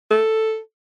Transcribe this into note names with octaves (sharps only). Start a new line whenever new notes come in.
A4